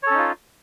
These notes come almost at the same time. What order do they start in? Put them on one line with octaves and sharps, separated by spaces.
C#5 A4 C#4 D#4 F4